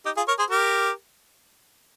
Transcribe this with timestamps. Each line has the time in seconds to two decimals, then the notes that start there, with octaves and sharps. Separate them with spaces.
0.05 D#4 G4
0.17 F4 G#4
0.28 A#4 C#5
0.39 G#4 C5
0.50 G4 A#4